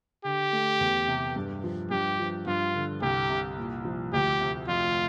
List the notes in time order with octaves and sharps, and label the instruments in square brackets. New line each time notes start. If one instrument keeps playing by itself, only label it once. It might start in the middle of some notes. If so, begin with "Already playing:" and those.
[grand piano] D3 [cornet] G4
[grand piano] A3
E2
C3
G2
F3
[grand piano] G2 [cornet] G4
[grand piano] F3
[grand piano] G2 [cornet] F4
[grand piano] D3
[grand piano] C2 [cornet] G4
[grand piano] C3
A#2
F3
[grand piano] D2 [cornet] G4
[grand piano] C3
[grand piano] F2 [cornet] F4